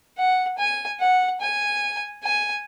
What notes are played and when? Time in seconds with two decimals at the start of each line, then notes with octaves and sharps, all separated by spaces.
0.18 F#5
0.58 G#5
1.00 F#5
1.41 G#5
2.23 G#5